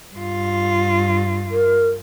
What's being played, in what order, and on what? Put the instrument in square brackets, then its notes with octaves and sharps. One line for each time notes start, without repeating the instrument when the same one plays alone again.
[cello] G2 F4
[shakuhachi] A#4